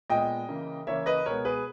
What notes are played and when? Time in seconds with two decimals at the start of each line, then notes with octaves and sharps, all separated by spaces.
0.09 A#2 G#3 B3 D#5 G5
0.49 C#3 E3 A#3
0.87 C#3 E3 A#3 C#5 E5
1.06 B4 D#5
1.26 B2 G#3 B3 A#4 C#5
1.45 G#4 B4